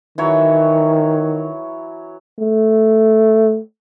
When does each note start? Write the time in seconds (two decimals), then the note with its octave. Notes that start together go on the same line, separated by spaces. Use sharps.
0.18 D#3 E3 F#3 C#5
2.39 A3